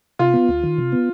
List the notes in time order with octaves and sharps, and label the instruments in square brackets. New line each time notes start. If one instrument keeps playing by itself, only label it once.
[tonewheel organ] C3 [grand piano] F4
[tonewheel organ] B3
D2
D#3
C3
B3